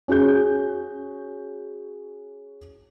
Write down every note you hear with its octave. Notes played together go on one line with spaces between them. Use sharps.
C#4 F#4 G#4 G6